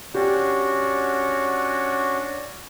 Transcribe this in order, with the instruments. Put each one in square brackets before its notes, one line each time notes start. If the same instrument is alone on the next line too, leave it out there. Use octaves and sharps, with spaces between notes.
[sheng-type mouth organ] C#4 D4 F#4 [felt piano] G4